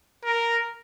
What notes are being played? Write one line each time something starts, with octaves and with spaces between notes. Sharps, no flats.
A#4